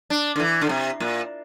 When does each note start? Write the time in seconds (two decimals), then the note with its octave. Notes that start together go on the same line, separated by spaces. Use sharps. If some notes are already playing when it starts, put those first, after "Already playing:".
0.10 D4
0.36 D3
0.40 E3
0.61 D3
0.69 C3
1.00 A#2